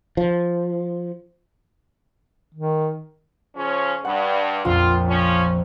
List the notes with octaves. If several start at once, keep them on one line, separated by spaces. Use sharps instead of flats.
F3
D#3
C#3 F3 C#4
G2 F#5
A#1 F2 F4
F3 C#4